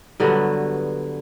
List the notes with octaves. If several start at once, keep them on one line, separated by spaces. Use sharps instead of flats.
G2 D3 F#3 B3